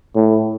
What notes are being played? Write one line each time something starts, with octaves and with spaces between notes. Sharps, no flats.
A2